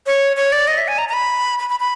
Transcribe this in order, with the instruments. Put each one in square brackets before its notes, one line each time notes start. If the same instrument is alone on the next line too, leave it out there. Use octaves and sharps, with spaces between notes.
[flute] C#5
C#5
D5
D#5
E5
G#5
A#5
A#5
B5
B5
B5
B5